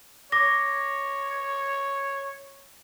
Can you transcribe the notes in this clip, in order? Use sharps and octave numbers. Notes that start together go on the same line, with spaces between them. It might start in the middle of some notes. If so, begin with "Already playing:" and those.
C#5 D6 A#6